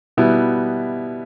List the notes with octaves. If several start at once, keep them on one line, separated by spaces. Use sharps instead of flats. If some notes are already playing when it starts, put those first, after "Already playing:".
B2 G3 B3 E4